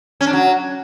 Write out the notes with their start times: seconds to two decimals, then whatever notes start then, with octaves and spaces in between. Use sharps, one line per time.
0.21 C#4
0.27 D4
0.33 F#3